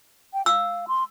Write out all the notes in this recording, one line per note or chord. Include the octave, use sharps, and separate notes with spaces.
G5
F5 E6
C6